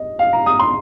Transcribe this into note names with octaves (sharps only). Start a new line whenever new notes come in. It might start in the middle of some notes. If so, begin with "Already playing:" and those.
Already playing: D#5
F5
A#5
D#6
C6